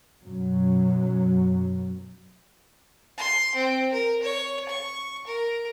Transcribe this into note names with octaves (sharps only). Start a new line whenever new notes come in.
F#2 B2 F#3
C6
C4
A#4
C#5
C#6
A#4